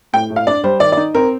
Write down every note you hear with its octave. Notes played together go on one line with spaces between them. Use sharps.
A2 G5
A2
F5
D4 D5
G3 C5
D#3 D5
D5
D#4
C4 A#4